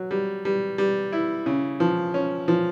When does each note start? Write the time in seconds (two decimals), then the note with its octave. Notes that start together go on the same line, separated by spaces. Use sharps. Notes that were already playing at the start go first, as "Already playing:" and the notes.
Already playing: F#3
0.11 G3
0.45 G3
0.78 G3
1.12 E4
1.46 C#3
1.80 F3
2.14 C#4
2.48 F3